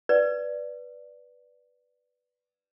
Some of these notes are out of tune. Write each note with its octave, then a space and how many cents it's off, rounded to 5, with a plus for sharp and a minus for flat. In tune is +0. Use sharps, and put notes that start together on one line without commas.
B4 +0 D5 +0